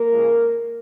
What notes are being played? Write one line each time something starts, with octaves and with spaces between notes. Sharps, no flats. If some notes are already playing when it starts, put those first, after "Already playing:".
Already playing: A#3 A#4
C#2 C#3 F3 G#3